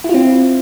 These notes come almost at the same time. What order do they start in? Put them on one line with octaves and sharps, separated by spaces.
E4 F4 C4